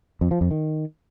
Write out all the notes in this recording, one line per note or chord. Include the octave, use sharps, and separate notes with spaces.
F2
F3
F2
D#3